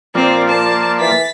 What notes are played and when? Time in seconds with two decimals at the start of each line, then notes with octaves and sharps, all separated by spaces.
0.15 A#2 F3 A#3 C4 D5
0.49 A5
1.00 E3 A6 B6